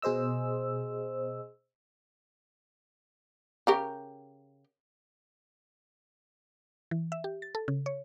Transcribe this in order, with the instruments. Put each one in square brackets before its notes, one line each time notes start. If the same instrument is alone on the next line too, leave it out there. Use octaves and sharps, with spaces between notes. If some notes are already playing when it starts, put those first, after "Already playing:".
[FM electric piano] B2 G#4 C5 D#5 E6
[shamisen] C#3 G4 A#4
[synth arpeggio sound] E3
E5
G4
A6
A4
C#3
C#5